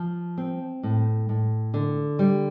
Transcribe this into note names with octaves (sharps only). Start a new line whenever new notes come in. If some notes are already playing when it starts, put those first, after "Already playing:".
Already playing: F3
C4
A2
A2
D3
G3